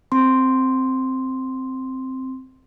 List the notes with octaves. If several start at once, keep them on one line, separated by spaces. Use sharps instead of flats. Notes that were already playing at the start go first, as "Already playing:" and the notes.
C4 C6